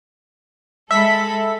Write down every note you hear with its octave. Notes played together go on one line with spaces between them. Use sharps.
G#3 A4 E5 B5 B6